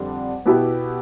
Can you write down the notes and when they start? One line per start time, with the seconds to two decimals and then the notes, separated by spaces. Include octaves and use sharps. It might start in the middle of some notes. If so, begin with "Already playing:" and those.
Already playing: F2 D3 G3 D4
0.46 B2 B3 E4 G4 B4